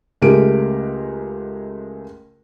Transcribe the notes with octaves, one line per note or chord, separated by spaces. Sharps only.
C#2 G#3 A3 G4 A#4 D7